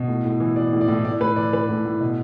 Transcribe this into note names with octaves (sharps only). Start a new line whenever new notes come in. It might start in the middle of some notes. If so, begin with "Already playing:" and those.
Already playing: B2
A2
A2
E3
E3 D5
A2
D5
A2
A2 D5
A2 B4
E3 D5
E3 B4
A2
A2
B2